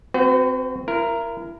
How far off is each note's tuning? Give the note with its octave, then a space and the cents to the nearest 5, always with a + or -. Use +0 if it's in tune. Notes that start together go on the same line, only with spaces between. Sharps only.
C4 +0 F#4 +0 B4 +45
E4 +35 A#4 +0